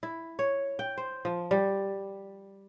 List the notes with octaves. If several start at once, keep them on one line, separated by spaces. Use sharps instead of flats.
E4
C#5
G5
C5
F3
G3